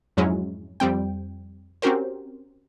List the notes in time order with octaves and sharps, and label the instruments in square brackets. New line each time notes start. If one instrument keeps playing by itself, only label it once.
[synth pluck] F2 G#2 F#3 G#3 C#4 E4
F2 G3 C4 G5
C4 C#4 F#4 G4 A#4 C5